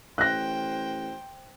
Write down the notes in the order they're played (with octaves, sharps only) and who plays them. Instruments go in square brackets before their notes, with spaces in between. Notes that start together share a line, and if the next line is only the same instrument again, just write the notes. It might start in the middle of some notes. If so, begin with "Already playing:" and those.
[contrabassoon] A1 [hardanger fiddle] C5 G5 [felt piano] F#6 A#6